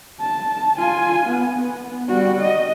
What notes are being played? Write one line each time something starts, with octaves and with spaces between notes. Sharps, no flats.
A5
F4 G#5
B3
B3
G3 F#4
D#5